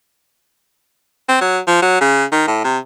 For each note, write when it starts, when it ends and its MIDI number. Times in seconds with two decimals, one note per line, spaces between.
1.29 1.38 60
1.41 1.59 54
1.67 1.82 53
1.82 1.96 54
2.01 2.25 49
2.32 2.46 51
2.47 2.61 45
2.64 2.78 48